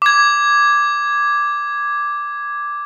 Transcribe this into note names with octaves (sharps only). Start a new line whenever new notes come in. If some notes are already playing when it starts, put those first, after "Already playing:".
D6 G#6